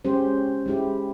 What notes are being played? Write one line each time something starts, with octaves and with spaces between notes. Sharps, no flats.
G#3 C#4 G4 C5
G#3 E4 G4